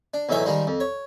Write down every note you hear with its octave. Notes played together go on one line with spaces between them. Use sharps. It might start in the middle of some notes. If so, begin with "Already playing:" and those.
D4
B1 E2 A2 D#4 E5 G#5
D#3 F3 G3 G#3
F2
C#5